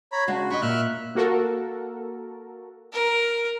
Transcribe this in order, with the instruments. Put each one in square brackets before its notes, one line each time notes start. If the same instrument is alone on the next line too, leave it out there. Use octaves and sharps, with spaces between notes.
[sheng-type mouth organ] C#5 A#5 B5
[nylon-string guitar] C#3 G#3 D4 [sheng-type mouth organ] F#4
[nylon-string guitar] G4 D#5 [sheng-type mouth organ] B5 C#6
[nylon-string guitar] A#2 [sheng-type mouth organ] E5 F6 F#6
[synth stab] A#3 F#4 A4 A#4
[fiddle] A#4